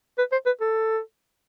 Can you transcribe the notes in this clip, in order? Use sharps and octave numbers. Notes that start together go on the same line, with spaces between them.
B4
C5
B4
A4